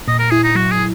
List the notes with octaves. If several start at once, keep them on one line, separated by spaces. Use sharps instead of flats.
A#2 D#5
A#4
E4 G#4
D#4
F#3 F#4
G#4